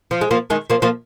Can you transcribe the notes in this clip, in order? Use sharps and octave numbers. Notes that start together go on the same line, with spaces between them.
F3
G#3
F3 A#3
D#3 G#3
F3 A#3
F3 A#3